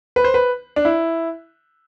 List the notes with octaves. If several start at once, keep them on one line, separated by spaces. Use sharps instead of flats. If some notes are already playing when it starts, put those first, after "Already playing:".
B4
C5
B4
D4
E4